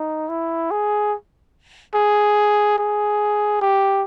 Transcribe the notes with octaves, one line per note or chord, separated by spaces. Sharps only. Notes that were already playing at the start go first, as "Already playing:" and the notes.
Already playing: D#4
E4
G#4
G#4
G#4
G4